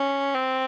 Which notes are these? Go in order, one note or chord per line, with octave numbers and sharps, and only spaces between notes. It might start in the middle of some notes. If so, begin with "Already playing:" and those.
Already playing: C#4
C4